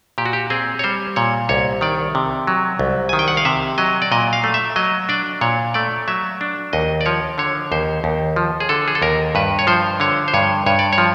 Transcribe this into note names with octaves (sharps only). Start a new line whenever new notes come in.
A#2 G4
F#4
G4
C4 G#4
C#5
G3 C5
A#2 C#5
C2 C#5
D#3 D5
C3
F#3
C2
D#3 G#5
G5
F#5
F5
C3 E5
F#3 D#5
D5
A#2 D#5
F5
A3
E5
F#3 D#5
D4 D5
A#2 C#5
A3 D5
F#3 E5
D4
D#2 D#5
D5
F3 C#5
D3 C#5
D#2 C5
D#2
F3
G#4
D3 A4
G#4
A4
D#2 A#4
G2 B4
C#5
F3 C5
D3 C#5
C5
G2 C#5
G2 C#5
D5
C#5
F3